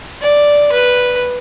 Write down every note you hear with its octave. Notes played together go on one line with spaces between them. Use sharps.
D5
B4